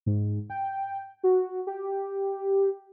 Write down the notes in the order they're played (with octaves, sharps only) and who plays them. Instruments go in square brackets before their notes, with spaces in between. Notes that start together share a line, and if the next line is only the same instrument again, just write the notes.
[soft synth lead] G#2
G5
F#4
G4